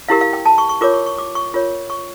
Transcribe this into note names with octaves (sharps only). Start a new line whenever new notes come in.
E4 G4 A#4 F5
F5
G5
A5
C#6
C#6
F4 A#4 C#5 D6
C#6
C#6
D6
C#6
F4 A#4 C#5
C#6